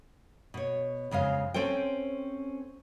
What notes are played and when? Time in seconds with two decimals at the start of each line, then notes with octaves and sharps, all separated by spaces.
0.54 B2 C#5
1.11 F2 C#3 G#3 F5
1.54 C4 C#4 A4 C5 G5